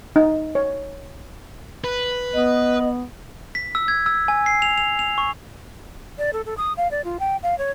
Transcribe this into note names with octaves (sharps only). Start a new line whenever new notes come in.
D#4
C#5
B4
B3 D#5
B6
E6
G#6
E6
G#5
C7
F7
F7
F7
C#6
D5
A4
A4
D#6
F5
D5
F4
G5
F5
C#5